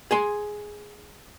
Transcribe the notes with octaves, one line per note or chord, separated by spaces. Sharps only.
G#4 G#5 C6